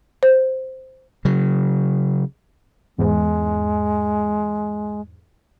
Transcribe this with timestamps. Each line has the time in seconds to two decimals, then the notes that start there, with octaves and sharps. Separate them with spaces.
0.23 C5
1.25 C#3 F#3
2.98 E2 G#2 G#3